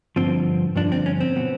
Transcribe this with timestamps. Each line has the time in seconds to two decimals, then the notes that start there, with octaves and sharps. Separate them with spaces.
0.16 G2 D3 F3 C4
0.76 G2 D3 F3 D4
0.92 C4
1.06 C#4
1.20 C4
1.36 B2 F#3 B3